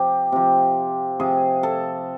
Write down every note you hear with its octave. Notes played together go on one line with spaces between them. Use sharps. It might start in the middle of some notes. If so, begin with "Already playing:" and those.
Already playing: C3 F3 G4
C3 F3
C3 F3 G#4
A4